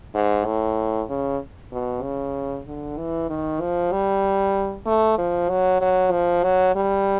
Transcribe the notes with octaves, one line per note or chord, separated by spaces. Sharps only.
G#2
A2
C#3
B2
C#3
D3
E3
D#3
F3
G3
A3
F3
F#3
F#3
F3
F#3
G3